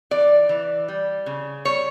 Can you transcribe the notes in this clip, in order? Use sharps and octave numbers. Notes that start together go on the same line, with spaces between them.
E3 D5
E3
G3
C#3
G3 C#5